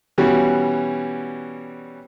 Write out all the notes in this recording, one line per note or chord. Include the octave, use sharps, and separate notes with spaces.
B2 E3 G3 C#4 F#4